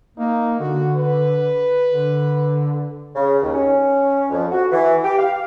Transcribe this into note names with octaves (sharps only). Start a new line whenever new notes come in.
A#3 D#4
D3 F#4
B4
D3
C#3
D#2
C#4
F2
F#4
E3
G4
F5